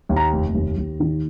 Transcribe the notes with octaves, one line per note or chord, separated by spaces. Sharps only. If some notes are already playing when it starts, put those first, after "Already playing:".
D#2
A#5
F1
D#2
D#2
D#3